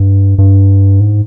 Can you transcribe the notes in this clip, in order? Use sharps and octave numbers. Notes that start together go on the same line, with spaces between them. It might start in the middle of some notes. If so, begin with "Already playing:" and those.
Already playing: G2
G2
G#2